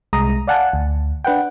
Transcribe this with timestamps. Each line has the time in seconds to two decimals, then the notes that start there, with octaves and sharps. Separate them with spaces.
0.13 C2 G#3 A#5 D#6
0.47 D5 F5 F#5 G#5 A5
0.73 D2
1.24 D4 B4 F#5 G5